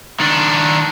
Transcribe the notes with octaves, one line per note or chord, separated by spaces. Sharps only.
D#3 D4